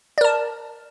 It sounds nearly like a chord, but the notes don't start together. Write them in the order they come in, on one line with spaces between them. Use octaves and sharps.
D5 A#4 A5